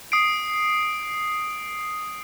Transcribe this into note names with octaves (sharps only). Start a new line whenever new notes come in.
D#6 C7 D7